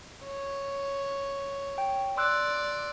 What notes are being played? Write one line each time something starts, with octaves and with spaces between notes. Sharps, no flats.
C#5
G5
D5 C6 E6 F#6